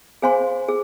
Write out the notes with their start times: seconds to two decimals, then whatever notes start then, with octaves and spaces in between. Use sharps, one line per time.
0.22 G#4 C5 F5 G#5 C6
0.68 G#4